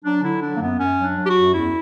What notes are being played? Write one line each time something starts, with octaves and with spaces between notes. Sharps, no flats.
F#3 D4
D3 E4
F#3 D4
A#3
F#2 B3
F#2 C#4
F#3
D4
F#3
G4
F#4
F#2
E2 E4